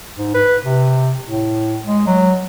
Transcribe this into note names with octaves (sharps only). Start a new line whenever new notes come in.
G#2
B4
C3
A2
G#3
F#3